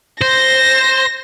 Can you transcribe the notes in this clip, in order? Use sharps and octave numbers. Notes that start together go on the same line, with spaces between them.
C5 A#6